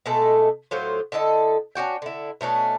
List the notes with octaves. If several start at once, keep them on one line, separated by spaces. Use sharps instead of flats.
B2 G#3 A3 A4
A2 F#3 F4 C5
D3 E4 A4 D#5
C#4 D4 F#4 G5
D3 E4
B2 A3 C#4 D4